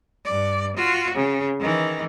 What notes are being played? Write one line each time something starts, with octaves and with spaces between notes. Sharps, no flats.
G2 D5
F4 F#4
C#3
D#3 E3